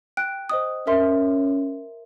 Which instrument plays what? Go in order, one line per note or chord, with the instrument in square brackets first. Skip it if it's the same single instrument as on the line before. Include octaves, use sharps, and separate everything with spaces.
[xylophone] G5 F#6 D7
C5 D#5 D#6
[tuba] C#4 [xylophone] A#4 E5 C6